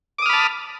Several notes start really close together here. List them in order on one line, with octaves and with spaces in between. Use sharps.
D6 D#6 F6 B5 A5